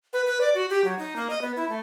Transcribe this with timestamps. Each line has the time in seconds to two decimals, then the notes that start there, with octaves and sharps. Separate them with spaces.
0.13 B4
0.26 B4
0.41 D5
0.55 F#4
0.70 G4
0.84 F#3
0.99 D#4
1.16 A#3
1.30 D#5
1.41 B3
1.56 E4
1.69 A3